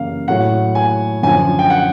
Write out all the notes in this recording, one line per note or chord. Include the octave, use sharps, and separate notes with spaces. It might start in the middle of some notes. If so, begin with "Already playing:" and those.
Already playing: F#2 C#3 E3 G3 A#3 F5
A2 F#3 A3 F#5
G#5
F#2 D3 F3 G#5
G5
F#5